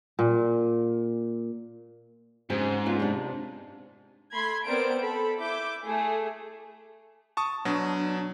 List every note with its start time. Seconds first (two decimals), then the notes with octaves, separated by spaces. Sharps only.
0.19 A#2
2.50 G#2 C#3 C4 G#4
2.86 B3 C#4 F4
3.00 C3 D4
4.34 A3 B5 C6 G#6
4.67 B3 C4 A#4 C5 D5 D7
5.01 A4 B5
5.40 E4 D6 G6
5.85 A3 G#4
7.37 A5 C#6 D#6
7.65 B2 F#3 D4